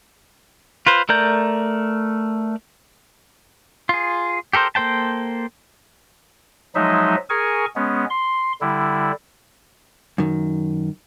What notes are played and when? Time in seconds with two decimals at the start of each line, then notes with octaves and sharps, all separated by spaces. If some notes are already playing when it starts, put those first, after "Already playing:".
0.87 F4 B4 C5
1.09 A3 A#4 D5 A#5 G6
3.89 F4 G#4
4.53 G4 A4 A#4 C5
4.75 A#3 A4 C5 G5 A5
6.75 F3 F#3 G#3 D#4 D#5 E5
7.30 G#4 A#4 G#5 C#6
7.76 G#3 B3 C#4
8.10 C6
8.61 D3 G3 E4
10.18 F#2 D#3